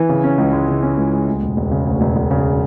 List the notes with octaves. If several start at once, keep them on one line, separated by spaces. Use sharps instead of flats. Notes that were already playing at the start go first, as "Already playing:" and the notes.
Already playing: E3
C#3
C#4
C#2
G#3
C#3
C#4
C#2
G#3
D2
E1
E1
C#3
D2
E1
E1
C#3